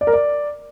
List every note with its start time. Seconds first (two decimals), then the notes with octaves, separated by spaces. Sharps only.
0.01 D5
0.07 A#4
0.13 D5